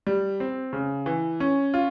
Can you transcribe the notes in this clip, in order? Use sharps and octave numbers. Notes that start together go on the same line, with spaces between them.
G3
C4
C#3
E3
C#4
F4